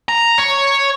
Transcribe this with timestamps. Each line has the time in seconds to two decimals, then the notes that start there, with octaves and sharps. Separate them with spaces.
0.09 A#5
0.39 C#5